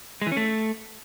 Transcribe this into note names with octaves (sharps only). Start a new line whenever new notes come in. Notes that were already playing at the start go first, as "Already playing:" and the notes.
G#3
E3
C#4
A3